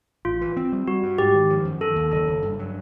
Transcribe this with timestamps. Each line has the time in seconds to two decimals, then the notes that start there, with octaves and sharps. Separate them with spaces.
0.25 A1 F4
0.41 E3
0.57 C4
0.72 G3
0.88 G3 F#4
1.03 G2
1.18 G#2 G4
1.34 D#3
1.50 F3
1.65 F#2
1.81 D#3 A4
1.96 D#2
2.12 F#1 A4
2.27 F#1
2.42 G2
2.59 F#3